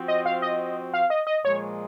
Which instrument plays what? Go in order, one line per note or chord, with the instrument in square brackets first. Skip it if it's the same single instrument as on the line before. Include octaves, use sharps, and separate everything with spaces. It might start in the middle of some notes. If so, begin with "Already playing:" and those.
Already playing: [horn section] F3 C4 F#4
[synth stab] D#5
F5
D#5
F5
D#5
D#5
[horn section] A#2 F3 G#3 [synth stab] C#5